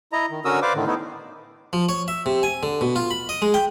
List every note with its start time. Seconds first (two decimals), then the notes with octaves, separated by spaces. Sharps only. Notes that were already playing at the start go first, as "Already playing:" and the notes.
0.12 E4 D#5 A#5
0.31 D#3
0.45 D3 C#4 F#4 A#4 D#6 E6
0.62 B4 C5 D5 F5 D6
0.75 A2 D3 D#3
0.87 A3 B3 D#4 E4
1.73 F3
1.89 C#5
2.08 E5
2.26 C3
2.43 G#5
2.63 D3
2.81 B2
2.96 F4
3.11 B5
3.29 D#5
3.42 G#3
3.54 G5